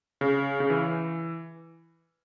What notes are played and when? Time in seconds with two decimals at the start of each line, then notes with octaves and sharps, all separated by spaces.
0.21 C#3
0.60 C#3
0.70 E3